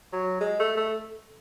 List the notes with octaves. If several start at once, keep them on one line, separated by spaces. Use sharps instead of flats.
F#3
G#3
A3
A3